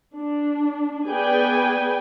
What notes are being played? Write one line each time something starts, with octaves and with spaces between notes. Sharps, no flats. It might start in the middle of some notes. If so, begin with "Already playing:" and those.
D4
B3 G#4 B4 D5 G5 G#5